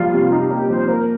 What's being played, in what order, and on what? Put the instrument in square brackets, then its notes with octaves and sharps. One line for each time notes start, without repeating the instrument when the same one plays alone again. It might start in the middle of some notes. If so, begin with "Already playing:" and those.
Already playing: [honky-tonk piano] F3 G3 A#3 [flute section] F4
[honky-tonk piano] C3
[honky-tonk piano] D#4 [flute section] G4
[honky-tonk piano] A#3 [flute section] G4
[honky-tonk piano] F3 [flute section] C5
[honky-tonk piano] A#3 [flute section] A#4